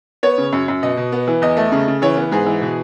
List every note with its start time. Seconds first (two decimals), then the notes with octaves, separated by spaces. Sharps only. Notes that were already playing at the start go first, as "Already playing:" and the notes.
0.23 B3 C#5
0.38 C#3
0.53 F#2
0.68 F#2
0.83 B2 D#5
0.97 B2
1.12 B3
1.28 E3
1.42 E2 D#5
1.57 A3
1.72 C#3
1.88 C#3
2.02 E3 C#5
2.17 B3
2.31 G#2 G#4
2.46 E3
2.62 B2